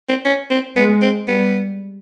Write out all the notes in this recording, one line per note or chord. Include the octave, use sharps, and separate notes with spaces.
C4
C#4
C4
G#3 B3
C4
G3 B3